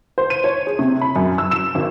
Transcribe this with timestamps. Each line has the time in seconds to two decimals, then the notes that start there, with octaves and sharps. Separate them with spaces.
0.18 C5
0.30 D#7
0.44 C#5
0.67 G#4
0.79 C3
1.01 B5
1.16 F#2
1.38 E6
1.51 E7
1.75 G#1